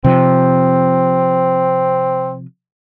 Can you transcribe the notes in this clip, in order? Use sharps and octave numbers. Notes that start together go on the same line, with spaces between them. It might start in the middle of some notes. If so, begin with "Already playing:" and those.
C3 F3 C4